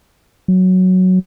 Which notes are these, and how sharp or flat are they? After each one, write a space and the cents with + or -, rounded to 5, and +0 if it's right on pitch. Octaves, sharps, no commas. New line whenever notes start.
F#3 +0